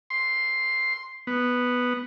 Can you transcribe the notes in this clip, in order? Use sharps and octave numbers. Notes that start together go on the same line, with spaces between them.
C6
B3